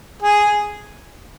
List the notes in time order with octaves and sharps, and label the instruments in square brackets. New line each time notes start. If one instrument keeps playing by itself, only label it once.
[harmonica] G#4